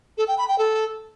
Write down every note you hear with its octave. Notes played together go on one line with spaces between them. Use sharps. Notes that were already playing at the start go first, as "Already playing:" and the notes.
A4
G5
B5
G5
A4